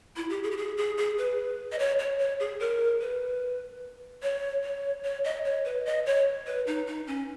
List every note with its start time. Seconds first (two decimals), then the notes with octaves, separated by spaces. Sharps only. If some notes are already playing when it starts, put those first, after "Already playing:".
0.16 E4
0.30 G4
0.43 G#4
0.51 G4
0.57 G#4
0.77 G#4
0.98 G#4
1.18 B4
1.72 D#5
1.79 C#5
1.99 C#5
2.19 C#5
2.40 G#4
2.60 A#4
3.01 B4
4.23 C#5
4.64 C#5
5.04 C#5
5.24 D#5
5.45 C#5
5.65 B4
5.86 D#5
6.06 C#5
6.47 B4
6.67 D#4
6.87 D#4
7.07 C#4